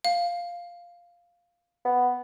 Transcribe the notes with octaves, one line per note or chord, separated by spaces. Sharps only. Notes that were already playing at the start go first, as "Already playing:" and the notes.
F5
B3